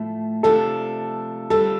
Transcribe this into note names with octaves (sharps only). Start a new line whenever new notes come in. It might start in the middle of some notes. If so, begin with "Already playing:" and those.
Already playing: A2 F3 A3
C3 F3 A3 D4 F4 A4
D3 G3 C4 F4 A4